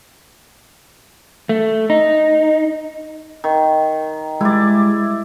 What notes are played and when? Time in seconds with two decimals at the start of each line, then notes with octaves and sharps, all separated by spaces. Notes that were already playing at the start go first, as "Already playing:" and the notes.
1.49 A3
1.90 D#4
3.44 D#3
4.41 G3 G#3 E4 G4 D5